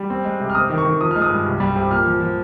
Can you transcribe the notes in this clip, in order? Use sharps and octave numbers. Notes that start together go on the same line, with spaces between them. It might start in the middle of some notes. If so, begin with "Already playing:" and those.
Already playing: G3
C4
G#3
C3
F6
C4 D#6
D#3
C#6
D#3
F3 D#6
G#3 F6
D#6
G2
C2
G3
C3
A#2 F6
F3
F3